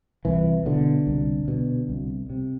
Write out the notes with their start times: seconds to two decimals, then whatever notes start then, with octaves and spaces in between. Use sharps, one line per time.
0.25 C2 E3
0.66 B2 D3
1.07 C2
1.48 B2
1.89 C2
2.30 C3